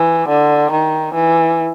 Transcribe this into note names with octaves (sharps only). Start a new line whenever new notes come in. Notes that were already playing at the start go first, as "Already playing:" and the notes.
Already playing: E3
D3
D#3
E3